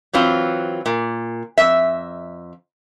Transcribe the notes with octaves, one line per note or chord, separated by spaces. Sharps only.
E3 F#3 C4 F4
A#2
F2 E5